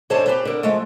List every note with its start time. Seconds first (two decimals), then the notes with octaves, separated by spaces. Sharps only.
0.10 G#2 D3 C5 C#5 G#5 A5
0.26 G4 B4 C5
0.45 D3 A#4
0.63 F3 G#3 A3